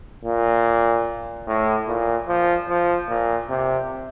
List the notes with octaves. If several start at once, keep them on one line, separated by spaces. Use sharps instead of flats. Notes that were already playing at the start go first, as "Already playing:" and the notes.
A#2
A2
A#2
F3
F3
A#2
C3